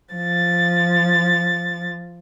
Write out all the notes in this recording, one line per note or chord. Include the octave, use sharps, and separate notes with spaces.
F3 A6